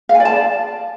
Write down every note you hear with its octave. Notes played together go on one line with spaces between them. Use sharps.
F5
G#5
D5
A5